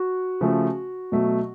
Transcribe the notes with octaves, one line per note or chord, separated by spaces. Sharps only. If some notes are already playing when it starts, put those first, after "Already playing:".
Already playing: F#4
C#3 F3 A3
B2 F#3 A3